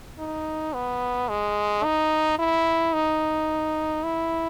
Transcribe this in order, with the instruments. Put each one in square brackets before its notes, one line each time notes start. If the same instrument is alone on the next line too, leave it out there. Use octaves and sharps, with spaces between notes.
[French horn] D#4
B3
G#3
D#4
E4
D#4
E4